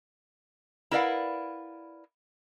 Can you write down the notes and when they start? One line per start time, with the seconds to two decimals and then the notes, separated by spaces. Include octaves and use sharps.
0.91 E4 A#4 B4 D5 F5 F#5